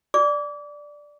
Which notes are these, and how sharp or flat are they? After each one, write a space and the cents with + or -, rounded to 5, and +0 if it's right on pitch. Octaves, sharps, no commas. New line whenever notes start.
D5 +0 D6 -30